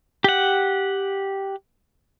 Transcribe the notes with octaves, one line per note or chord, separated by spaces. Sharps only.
G4 F#5